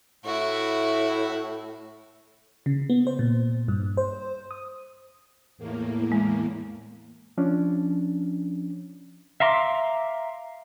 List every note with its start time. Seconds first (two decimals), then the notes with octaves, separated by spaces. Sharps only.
0.25 A2 E4 F#4
2.66 C#3
2.90 B3
3.07 C5
3.19 A#2
3.68 G2
3.97 C5
4.51 D#6
5.58 E2 A2 A#3
6.12 G#3
7.38 F3 C#4 D4
9.40 E5 F5 A#5 C6 D6